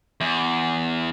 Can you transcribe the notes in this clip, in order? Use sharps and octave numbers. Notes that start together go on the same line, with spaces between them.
E2